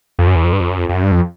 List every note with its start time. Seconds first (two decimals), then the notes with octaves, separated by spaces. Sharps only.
0.19 F2
0.27 F#2
0.36 E2
0.44 F2
0.53 G2
0.60 F2
0.70 F#2
0.78 F2
0.89 F2
0.94 F#2
1.03 G2
1.12 F2